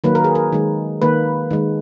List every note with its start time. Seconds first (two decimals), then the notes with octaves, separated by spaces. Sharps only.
0.04 D#3 F#3 A#3 B4
0.15 A#4
0.24 G#4
0.35 A#4
0.52 D#3 G#3
1.02 D#3 A#3 B4
1.51 D#3 G#3